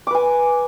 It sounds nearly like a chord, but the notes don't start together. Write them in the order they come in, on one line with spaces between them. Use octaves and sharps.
D6 B4 G#5